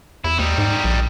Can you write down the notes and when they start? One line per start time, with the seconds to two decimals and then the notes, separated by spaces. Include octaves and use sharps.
0.24 E2 E4
0.39 D#2 G3 D#4
0.58 G#2
0.84 A#1